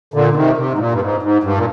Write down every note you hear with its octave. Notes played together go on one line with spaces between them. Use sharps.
A#2 D3
D3
C3 D#3
C3
G#2
A#2
G2
G#2
G#2
G2
A#2